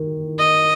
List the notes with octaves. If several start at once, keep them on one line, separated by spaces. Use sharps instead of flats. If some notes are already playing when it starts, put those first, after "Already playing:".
Already playing: D#3
D#5